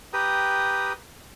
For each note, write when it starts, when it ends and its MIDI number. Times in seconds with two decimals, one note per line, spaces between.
0.13 0.93 67
0.13 0.93 71
0.13 0.93 79
0.13 0.93 82
0.13 0.93 87